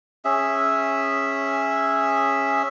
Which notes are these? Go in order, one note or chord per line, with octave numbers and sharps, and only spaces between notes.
C#4 G#4 E5